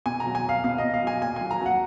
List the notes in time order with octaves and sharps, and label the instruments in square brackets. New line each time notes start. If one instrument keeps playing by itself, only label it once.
[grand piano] B2 G#5
A#5
F#3
G#5
F#3 F5
B2 F5
D#5
B2
F5
F#3 G#5
A#2 G#5
F#3 G#5
A#5
F#3 F#5